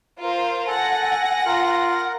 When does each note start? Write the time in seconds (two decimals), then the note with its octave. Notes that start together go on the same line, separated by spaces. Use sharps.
0.21 F4 A#4 C5
0.68 A4 F#5 G#5 A#6
1.46 F4 A#4